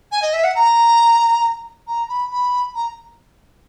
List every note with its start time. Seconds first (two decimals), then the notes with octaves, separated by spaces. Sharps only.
0.12 G#5
0.22 D#5
0.33 E5
0.44 F#5
0.55 A#5
1.87 A#5
2.09 B5
2.31 B5
2.75 A#5